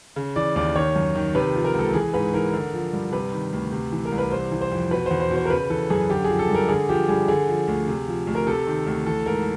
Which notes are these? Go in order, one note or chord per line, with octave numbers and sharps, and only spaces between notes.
C#3
E3 D5
D#2 D5
D#3 C#5
F#2
D#3
C3 B4
F3
A#4
C#2 A4
E3 G#4
G#2 B4
E3 A#4
D3
F3
G2
C3 B4
D#3
D2
C3
E3
A#4
C2
B4
C3 C5
E3
C5
F2
B2 B4
E2 C5
C5
B2 C5
A#4
C#3 B4
E3 A4
F#2 G#4
D3 G4
F3 G#4
A4
G2
A#4
D3 G#4
F3 G4
G2 G#4
D3 G#4
F3
D2
C3
F3
D2
A#4
C3 A4
D#3
D2
E3 A4
G#2 A#4